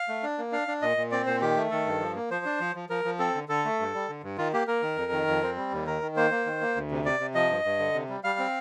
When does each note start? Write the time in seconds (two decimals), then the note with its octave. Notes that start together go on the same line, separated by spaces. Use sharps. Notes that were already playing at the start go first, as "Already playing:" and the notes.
Already playing: F5
0.08 A3
0.23 D4
0.38 A#3
0.52 D4 F5
0.68 D4
0.82 A#2 D#5
0.97 A#2
1.11 C4 D5
1.26 A#2 C5
1.41 D#3 G4
1.56 A3
1.71 D#3 A4
1.86 G2
2.01 F3
2.15 A#3
2.30 F3 C5
2.45 D4
2.60 F3
2.75 F3
2.89 F3 A#4
3.04 F3
3.19 C4 A4
3.35 D3
3.49 D3 A4
3.65 A3
3.80 G2
3.94 G3
4.08 D3
4.23 G2
4.38 D#3 F4
4.53 A#3 G4
4.67 A#3 A#4
4.82 D#3
4.97 F2
5.12 D#3
5.27 F2
5.43 C4
5.56 G3
5.72 D#2
5.87 D#3 A#4
6.02 D#3
6.16 A#3 C5
6.31 A#3
6.45 D#3
6.61 A#3
6.75 D2
6.91 C3
7.05 C3 D5
7.20 C3
7.34 F3 D#5
7.50 G2
7.65 G2
7.79 D3
7.94 C3
8.09 G3
8.24 G3 F5
8.39 C4